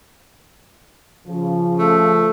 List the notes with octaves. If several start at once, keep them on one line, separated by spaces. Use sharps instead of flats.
C#3 F3
A3